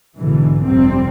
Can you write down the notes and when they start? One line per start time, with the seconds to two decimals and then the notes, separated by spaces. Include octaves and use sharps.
0.17 B1 G#2 B2 D3 E3
0.65 F1 G2 C3 G3 C4